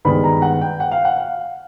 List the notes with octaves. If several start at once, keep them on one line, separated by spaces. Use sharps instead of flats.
G2 D#3 G#3 B3 B5
A#5
F#5
G5
F#5
F5
F#5
F5